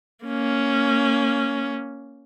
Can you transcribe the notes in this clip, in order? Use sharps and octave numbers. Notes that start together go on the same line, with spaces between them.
A#3 C#4